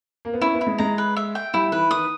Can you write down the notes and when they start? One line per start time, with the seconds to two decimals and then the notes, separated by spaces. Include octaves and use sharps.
0.25 A#3
0.33 B3
0.41 C#4 E4
0.55 B3
0.61 E4
0.67 G#3
0.78 G#3 A#5
0.98 B4
1.16 E5
1.35 G5
1.54 G3 E4
1.72 E3 B4
1.91 D#3 D#6